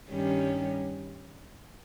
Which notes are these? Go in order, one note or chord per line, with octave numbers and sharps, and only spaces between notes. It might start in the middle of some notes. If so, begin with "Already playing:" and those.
G2 D#3 G3 C#4 G4